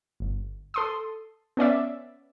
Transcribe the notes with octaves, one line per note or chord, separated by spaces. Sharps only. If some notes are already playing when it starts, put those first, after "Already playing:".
G1
A4 C6 D#6
B3 C#4 D5 E5